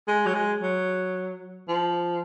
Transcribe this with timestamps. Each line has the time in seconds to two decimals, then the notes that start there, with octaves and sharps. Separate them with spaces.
0.08 G#3
0.26 F#3
0.34 G#3
0.61 F#3
1.69 F3